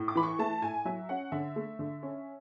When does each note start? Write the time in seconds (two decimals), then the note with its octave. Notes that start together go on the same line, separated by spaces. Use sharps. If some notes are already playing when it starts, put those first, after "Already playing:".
Already playing: A2
0.08 D6
0.15 E3 B5
0.23 C#6
0.39 A3 A5
0.62 A2 G#5
0.85 F#3 E5
1.09 C#4 F#5
1.32 D3 E5
1.56 A3
1.79 D3
2.03 C#4